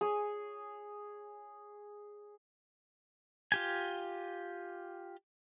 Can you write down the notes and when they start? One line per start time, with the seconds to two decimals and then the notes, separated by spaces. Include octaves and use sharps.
0.01 G#4 C#5 G#5
3.52 F4 G4 G#5